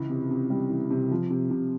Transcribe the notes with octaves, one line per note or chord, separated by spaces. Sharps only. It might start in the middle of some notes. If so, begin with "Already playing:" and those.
Already playing: C#2 E3
C3
C3
G3
E3
C3
F3
C3
C3